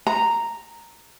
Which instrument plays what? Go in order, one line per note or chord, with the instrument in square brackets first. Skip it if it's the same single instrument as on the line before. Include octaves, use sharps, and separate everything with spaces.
[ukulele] A#5